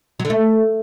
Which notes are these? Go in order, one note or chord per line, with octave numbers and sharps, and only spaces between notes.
F#3
D3
A3